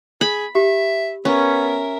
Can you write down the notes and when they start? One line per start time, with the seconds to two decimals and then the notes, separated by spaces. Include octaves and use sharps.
0.21 G#4 B5
0.55 G4 E5
1.25 B3 C#4 A#4 E5